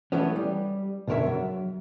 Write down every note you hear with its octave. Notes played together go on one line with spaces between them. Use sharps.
E3 F#3 A3 B3 C#4
G3
B1 F#2 D3 A#4 C#5 E5
F#3